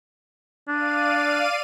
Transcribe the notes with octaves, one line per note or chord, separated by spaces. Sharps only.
D4 D5 F5 D#7